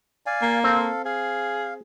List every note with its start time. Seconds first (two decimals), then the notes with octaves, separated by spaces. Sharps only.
0.26 D5 F5 G#5
0.42 A#3
0.64 C4 A4 F5
1.05 G#4 F5